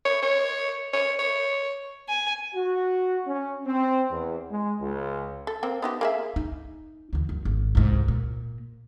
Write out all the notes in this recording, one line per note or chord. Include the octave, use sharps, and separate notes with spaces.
C#5
C#5
C#5
C#5
G#5
F#4
C#4
C4
E2
G#3
C#2
A4
A#3 C4 G5
B3 D#4 G4
A#3 G#4 E5
D#4
D2 E3
F#2
G#1
C2 G#2
A#2